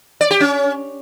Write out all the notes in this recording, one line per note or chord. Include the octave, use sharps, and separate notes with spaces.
D5
G4
C#4